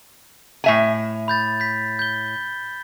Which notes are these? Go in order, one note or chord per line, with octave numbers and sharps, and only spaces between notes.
A2 E5 G#5
B5 G6 A6
G6 B6
G6 G7